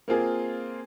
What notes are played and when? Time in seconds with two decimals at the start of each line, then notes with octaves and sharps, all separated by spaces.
0.08 A#3 C4 F4 G#4 A#4